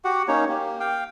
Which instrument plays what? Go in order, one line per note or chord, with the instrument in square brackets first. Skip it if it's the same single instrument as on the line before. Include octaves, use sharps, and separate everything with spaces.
[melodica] F#4 G4 F#5
A#3 C#4 D#4 C#5
A#3 G4
F5 G5